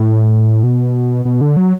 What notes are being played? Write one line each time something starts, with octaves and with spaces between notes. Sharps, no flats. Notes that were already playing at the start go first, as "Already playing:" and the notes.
Already playing: A2
B2
B2
D3
F#3